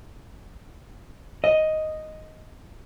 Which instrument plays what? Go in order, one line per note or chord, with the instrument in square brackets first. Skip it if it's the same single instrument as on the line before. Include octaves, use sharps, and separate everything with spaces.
[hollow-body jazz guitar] D#5